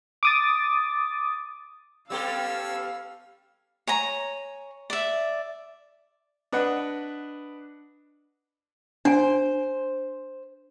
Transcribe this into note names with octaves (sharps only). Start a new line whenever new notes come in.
D6 D#6 A6
G3 B3 C#4 A4 F5 E6
C#5 G#5 A#5
D5 E5
D4 B4 D#5 F#5
D4 C5 G#5